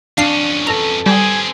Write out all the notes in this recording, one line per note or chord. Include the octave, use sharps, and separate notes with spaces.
F2 C#4 D4 F5 C7
A4 B4 A#5
G3 C4 G#4 G#5